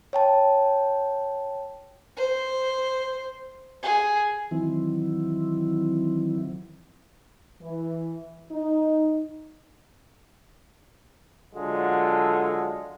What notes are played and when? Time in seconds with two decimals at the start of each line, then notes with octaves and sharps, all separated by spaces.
0.13 C#5 G5 A5
2.17 C5
3.83 G#4
4.51 D#3 E3 F#3 C4 E4
7.61 E3
8.51 D#4
11.55 D3 F#3 G#3 F4 A4